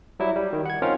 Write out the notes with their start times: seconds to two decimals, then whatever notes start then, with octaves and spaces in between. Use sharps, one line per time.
0.20 F#3 G3 E4
0.36 G3
0.53 D#3
0.66 F#5 G#6
0.82 C4 C#4 D#4 F4 A#4